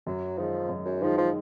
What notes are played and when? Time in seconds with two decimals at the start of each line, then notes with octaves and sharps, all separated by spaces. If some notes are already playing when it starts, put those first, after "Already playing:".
0.07 F#2 F#3
0.38 D#3 F3 G#3 D#4
0.69 F#2
0.85 F#2
1.01 D#3 F3 G#3 D#4
1.17 F3